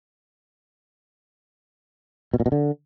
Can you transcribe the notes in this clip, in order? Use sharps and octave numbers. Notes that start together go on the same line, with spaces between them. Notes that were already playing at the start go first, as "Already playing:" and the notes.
B2
A#2
B2
D3